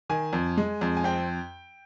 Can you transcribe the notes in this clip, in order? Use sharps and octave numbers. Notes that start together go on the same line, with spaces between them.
D#3 G#5
F2
G#3
F2
G#5
C4 G5